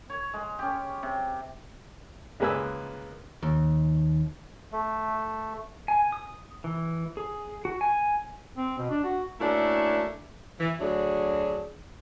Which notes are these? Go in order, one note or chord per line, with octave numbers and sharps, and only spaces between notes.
C#5
G#3
C#4 G4
C3
C#2 G#3 A#3 B4 G#5 E6
D#2
A3
G#5
D#6
E3
G#4
F#4
G#5
C4
B2
D4
F#4
A3 A#3 C#4 D4 E4 F#4
E3
D2 F#3 D4 G#4